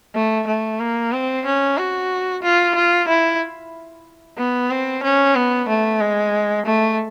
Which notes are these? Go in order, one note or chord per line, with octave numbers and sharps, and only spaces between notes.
A3
A3
A#3
C4
C#4
F#4
F4
F4
E4
B3
C4
C#4
B3
A3
G#3
A3